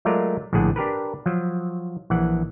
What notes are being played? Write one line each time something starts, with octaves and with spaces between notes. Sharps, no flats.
F#3 G#3 A3 F4 A#4 D5
A#1 A2 D3 D4 G#4 F#5
D4 G4 A#4 B4
F3 F#3
A#1 E3 F#5